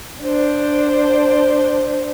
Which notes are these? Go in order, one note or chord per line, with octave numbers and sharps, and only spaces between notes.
D4 C5